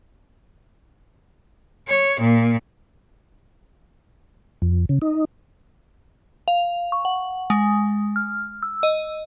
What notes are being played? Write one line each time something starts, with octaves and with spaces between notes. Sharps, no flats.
C#5
A#2
F2
C#3
D#4
F5
C#6
F#5
G#3
F6
E6
D#5